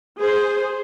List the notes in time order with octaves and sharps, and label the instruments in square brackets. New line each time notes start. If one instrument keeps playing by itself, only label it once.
[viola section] G#4 C5